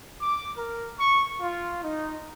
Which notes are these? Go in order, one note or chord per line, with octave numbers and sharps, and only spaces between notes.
D6
A#4
C#6
F4
D#4